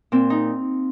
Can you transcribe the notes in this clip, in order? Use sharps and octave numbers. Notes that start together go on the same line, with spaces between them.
A#2 C4
D#4